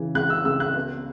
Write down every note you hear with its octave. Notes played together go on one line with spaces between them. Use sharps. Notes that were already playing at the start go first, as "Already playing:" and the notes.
Already playing: C#3 E3
C#2 F#6
E6
C#2 E6
F#6
B3